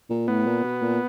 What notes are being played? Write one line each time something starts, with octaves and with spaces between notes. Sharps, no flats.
A#2
A2 B3
A#2
B2
A#2